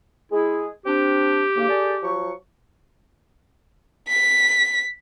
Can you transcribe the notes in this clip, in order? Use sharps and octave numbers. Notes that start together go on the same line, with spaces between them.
G#3 E4 G#4
C4 D4 G4
D2 G#2 A#3
G#4 A4 D5
F3 F#3 C#6
B6